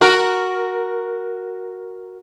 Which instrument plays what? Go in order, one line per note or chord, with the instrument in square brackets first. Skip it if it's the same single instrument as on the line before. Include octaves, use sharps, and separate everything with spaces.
[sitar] F#4 A#4